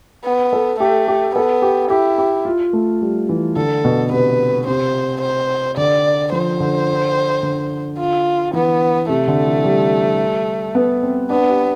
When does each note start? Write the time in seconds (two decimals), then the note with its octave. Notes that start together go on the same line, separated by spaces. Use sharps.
0.25 B3
0.53 A4
0.80 A3 G4
1.08 G4
1.35 B3 A4
1.62 G4
1.90 E4 G4
2.18 G4
2.45 F4
2.73 A3
3.02 G3
3.29 E3
3.56 D3 A4
3.85 B2
4.11 C3 B4
4.67 C3 C5
5.22 C5
5.77 D3 D5
6.32 F3 C5
6.60 D3
7.43 D3
7.99 F4
8.53 E3 B3
9.09 C3 A3
9.28 D3
9.46 E3
9.64 G3
10.75 B3
11.03 C4
11.30 B3 D4
11.49 G4